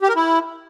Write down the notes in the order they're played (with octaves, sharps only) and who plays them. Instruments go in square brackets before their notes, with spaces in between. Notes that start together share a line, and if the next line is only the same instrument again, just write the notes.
[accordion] G4
A#4
E4